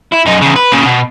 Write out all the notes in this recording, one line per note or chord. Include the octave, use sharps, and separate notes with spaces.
E4
F#2 D#4
E2 C#3
B4
A#2 C#3
B2